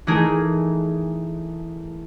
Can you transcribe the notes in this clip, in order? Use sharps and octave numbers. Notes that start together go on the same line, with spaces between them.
E3 A3 D#4 G#4 A#4